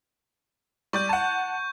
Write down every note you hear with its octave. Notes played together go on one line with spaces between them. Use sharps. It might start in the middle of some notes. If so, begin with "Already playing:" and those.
G3 D5 C#6 G6
F#5 A5